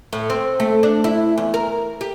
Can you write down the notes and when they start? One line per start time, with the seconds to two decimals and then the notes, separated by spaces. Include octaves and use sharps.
0.13 A2
0.30 C4
0.60 A3
0.83 D4
1.04 E4
1.38 E2
1.54 A#4
2.01 G4